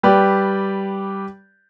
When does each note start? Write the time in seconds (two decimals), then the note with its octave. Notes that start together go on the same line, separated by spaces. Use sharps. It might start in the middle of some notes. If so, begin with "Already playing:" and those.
0.03 G3 G4 B4 D5